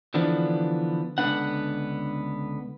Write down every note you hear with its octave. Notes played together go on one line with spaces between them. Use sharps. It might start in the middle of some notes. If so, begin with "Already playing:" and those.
D3 E3 F3 B3 D4
C#2 D3 E3 B3 D4 F#5